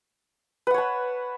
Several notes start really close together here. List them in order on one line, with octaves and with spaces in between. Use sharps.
B4 F#5 C#5 A5